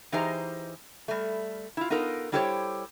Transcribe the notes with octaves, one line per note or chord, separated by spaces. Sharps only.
E3 D#4 G4 G#4 C5 A#5
G3 A3
E4 F4
B3 D#4 F4 A4 A#4
G3 E4 G4 A4 C5 C#5